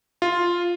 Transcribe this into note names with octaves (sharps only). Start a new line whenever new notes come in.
F4